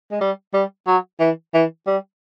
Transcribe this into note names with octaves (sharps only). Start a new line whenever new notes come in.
G#3
G3
G3
F#3
E3
E3
G3